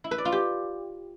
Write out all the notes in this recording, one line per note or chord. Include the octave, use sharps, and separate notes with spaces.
E4
B4
D5
F4
G4